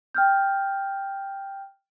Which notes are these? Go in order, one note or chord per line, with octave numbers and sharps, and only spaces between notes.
G5 F6 G6